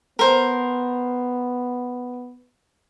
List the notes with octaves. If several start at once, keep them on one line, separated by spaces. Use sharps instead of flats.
B3 A#4 C5